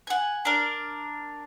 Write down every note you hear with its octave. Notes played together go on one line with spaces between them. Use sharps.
F#5 G#5
D4 A#4